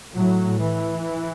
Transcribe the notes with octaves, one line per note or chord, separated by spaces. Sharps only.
A2 F#3
E3